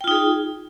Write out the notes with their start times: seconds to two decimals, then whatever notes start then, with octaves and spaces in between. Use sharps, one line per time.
0.01 G5
0.04 F4
0.08 D#4
0.11 G#4